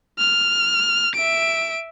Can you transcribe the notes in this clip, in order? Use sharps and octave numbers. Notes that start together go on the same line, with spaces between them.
F6
E5 D7